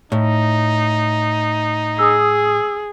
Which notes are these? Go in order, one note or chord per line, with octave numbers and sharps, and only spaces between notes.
A2 D#4
G#4 D#6 E6